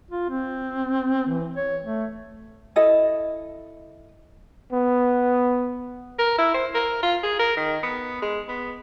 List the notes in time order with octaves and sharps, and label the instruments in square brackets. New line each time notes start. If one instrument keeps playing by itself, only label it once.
[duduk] F4
C4
E3
C#5
A3
[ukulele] E4 A4 D#5
[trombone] B3
[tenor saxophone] A#4
E4
C5
A#4
F4
G#4
A#4
D#3
B3
G#3
B3